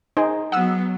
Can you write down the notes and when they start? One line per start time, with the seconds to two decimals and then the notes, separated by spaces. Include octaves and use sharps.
0.17 D#4 G#4 C5
0.52 F#3 B3 F#5 D#6 E6